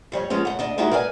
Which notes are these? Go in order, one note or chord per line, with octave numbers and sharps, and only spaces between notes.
F2 G3 C#5
F3 G#3 B3 C#4
F#2 F#5
D2 D4 D#5
G#3 C4 D#4 E4 F#4 G4
A#4 B4 D5 G#5